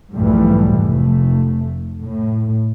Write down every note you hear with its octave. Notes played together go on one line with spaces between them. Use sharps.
B1 F2 G#2 E3 G3 A3
F1 A3
A2